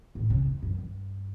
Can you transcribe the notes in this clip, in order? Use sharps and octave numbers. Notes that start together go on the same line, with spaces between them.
A2
C#3
E2
F#2
G2